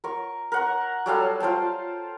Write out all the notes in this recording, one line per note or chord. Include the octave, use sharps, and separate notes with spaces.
A#4 C#6
A#4 F#5 C#6
F#3 G3 A4 F5
F4 C5 G5 A5